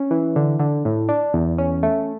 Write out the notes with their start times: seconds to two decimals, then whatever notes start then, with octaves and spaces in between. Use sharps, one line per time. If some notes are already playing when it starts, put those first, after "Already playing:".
Already playing: C#4
0.11 E3
0.36 D3
0.59 D3
0.85 A2
1.09 D4
1.34 E2
1.58 C#4
1.83 A3